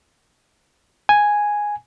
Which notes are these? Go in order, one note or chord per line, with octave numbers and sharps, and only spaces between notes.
G#5